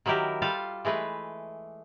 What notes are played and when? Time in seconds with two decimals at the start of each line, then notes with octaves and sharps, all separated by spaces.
0.06 D#3 F#3 E4 G4 A#4
0.42 G3 F4 G4 A4 F5
0.85 E3 G#3 A3 B4